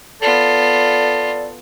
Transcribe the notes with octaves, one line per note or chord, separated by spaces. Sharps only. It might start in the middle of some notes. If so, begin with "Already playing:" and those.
B3 F4 A4 D5